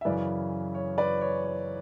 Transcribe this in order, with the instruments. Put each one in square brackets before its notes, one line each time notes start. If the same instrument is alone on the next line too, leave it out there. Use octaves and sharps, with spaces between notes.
[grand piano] E5
F#2 C#3 E3 B4 D5
C#5
B4 D5
C#5
C#5